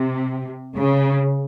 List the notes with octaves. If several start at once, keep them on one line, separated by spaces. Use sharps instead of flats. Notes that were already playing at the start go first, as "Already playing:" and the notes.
Already playing: C3
C#3